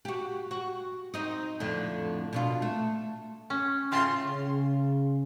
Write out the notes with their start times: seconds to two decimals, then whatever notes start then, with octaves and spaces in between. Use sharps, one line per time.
0.05 F#4 G4
0.51 F#4
1.14 C4 D#4 D#5
1.60 F2 A2 D3
2.33 B2 D4 F4
2.62 A3
3.50 C#4
3.92 A2 C#3 F4 C6
4.26 C#3